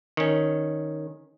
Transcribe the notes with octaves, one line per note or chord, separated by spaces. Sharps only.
D#3 C#4